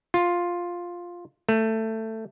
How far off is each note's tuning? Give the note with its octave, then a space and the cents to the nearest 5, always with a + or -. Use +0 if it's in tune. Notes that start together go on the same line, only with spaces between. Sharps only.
F4 +5
A3 +15